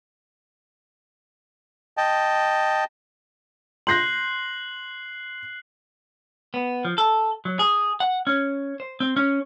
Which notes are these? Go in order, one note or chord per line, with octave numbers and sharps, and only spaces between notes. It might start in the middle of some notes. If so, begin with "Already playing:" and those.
D#5 G5 A5
C6 F#6 G6 A#6 C7 F#7
B3
F3
A4
F#3
G#4
F#5
C#4
C5
C4
C#4